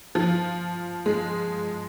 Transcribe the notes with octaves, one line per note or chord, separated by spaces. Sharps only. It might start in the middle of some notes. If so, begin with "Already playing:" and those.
F3
G#3